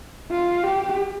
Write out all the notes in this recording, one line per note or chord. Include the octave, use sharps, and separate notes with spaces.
F4
G4